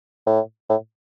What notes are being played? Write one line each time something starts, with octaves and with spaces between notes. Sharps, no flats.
A2
A2